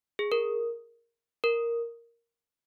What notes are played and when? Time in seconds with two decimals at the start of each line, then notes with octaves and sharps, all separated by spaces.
0.19 G#4
0.32 A#4
1.44 A#4